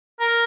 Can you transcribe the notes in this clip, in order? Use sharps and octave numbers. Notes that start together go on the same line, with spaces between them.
A#4